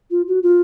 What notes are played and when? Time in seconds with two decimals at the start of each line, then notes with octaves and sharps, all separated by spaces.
0.11 F4
0.28 F#4
0.43 F4